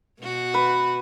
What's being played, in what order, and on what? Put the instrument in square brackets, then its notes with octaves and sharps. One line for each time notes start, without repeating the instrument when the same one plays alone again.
[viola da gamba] B2 F#4
[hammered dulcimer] B4